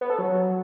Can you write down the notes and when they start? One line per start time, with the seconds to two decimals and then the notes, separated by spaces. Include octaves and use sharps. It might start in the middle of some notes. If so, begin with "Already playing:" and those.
0.01 B3
0.10 A4
0.18 F#3